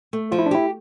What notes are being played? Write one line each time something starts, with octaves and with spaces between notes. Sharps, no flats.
A3
F3 F4
E4
D4
E4 G4